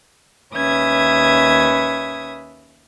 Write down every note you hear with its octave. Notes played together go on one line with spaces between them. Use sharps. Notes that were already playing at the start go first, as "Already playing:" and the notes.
D#2 C#4 B4 E5 D#6 G#6